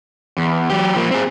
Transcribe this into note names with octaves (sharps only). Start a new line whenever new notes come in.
E2
F#3 G4
F3 A#3
C4 G#4